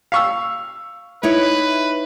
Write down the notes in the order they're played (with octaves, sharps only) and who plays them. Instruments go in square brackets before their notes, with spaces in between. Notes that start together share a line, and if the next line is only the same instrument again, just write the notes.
[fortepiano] F5 C#6 E6
[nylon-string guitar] D#4 E4 C#5 [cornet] B4